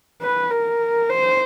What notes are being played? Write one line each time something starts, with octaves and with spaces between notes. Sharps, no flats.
B4
A#4
C5